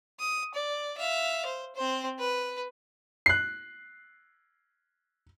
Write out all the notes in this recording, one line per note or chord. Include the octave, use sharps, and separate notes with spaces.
D#6
D5
E5 F5
C5
C4 C5
B4
F#6 C7